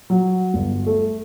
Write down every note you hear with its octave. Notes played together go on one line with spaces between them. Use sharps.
F#3
G1
A3